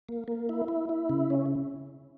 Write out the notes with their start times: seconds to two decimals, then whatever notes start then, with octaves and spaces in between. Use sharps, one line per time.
0.09 A#3
0.28 A#3
0.49 E4
0.68 E4
0.89 E4
1.10 C#3
1.30 C#4